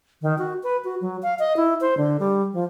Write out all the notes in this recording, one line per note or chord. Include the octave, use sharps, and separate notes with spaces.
D#3
F#4
B4
F#4
F#3
F5
D#5
E4
C5
D3
G3
F3